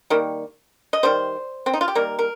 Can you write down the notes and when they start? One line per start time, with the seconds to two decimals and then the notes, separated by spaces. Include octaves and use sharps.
0.10 D#3 G3 A#3
0.93 D#5
1.03 D#3 G3 C5
1.66 C4
1.73 D#4
1.81 F4
1.88 G4
1.95 D#3 G3 A#3 A#4
2.19 A#4